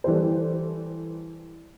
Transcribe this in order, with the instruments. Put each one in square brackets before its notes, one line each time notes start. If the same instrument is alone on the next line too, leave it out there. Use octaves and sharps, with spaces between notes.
[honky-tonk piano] E3 G3 A4 C5